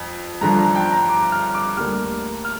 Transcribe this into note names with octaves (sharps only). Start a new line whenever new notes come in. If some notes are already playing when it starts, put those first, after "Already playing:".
Already playing: F2
G2 D3 F3 D4 A#5
A#5
G5
A#5
D6
F6
D6
D2 D3 G3 A#3 F6
F6